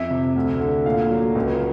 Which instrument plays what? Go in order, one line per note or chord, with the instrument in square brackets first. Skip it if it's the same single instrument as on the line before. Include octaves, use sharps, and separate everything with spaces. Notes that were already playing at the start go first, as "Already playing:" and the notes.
Already playing: [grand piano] F2 E5
C3
D2
D3
A#2 F5
F#3
C#2